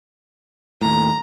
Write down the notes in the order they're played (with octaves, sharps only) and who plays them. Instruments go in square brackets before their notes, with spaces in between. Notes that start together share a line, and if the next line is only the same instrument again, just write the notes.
[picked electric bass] D#2 A2 [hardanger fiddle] A#5